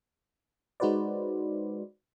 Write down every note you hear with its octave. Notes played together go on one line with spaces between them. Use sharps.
G#3 D#4 F#4 B4 C5 D5